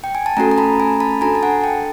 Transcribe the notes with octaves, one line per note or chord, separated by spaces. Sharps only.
G5
G#5
A5
A3 C#4 F#4 A4 G#5 A#5
A#5
A5 B5
G#5 A#5
A5 B5
D4 F#4 A4 G#5 A#5
A5
F#5 G#5
G5 A5